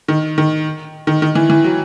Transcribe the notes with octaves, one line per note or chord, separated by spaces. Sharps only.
D#3
D#3
D#3
D#3
E3
E3
F#3